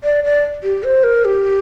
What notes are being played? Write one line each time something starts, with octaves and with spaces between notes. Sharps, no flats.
D5
D5
G4
C5
A#4
G4